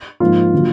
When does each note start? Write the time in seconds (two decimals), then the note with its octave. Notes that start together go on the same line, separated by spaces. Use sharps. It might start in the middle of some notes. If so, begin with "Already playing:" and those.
0.20 G#2 F3 A#3 F4
0.54 D3 F#3 A#3